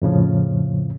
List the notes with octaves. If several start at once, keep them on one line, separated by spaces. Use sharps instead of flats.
F2 A2 C#3 F3